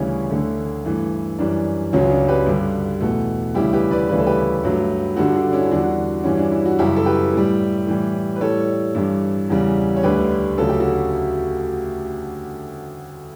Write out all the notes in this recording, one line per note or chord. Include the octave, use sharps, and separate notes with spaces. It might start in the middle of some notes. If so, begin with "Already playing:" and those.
Already playing: D2 C#3 E3 G3 C#4
D2 D3 A3
G2 E3 A3
F#2 E3 G3 D4
C#2 C#3 F#3 C#4
D4
G4 B4
G2 D3 G3
E2 B2 A3
D2 C#3 E3 G3 E4 G4
G4 B4
B4 D5
D2 C#3 E3 G3 B4
A4
G4 B4
G2 F#3 A3
G2 D3 G3 F#4 A4
D4 F#4
C#4 E4
E2 D3 G3 D4 F#4
G2 E3 G3 C#4
D4
E4
F#4
F#2 C#3 G3 E4 G4
A4
G4 B4
A2 G3
A2 E3 G3
B4
A2 G3 A4 C#5
G2 E3 G3
E2 C#3 G3
C#5
D2 D3 G3 G4 B4
D2 C#3 F#3 A4
G4
F#4 A4